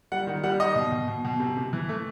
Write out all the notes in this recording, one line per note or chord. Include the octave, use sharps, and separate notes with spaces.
G3 F#5
D#3
G3 F#5
D#3 D#5
B2
B2
B2
B2
C3
C3
E3
A3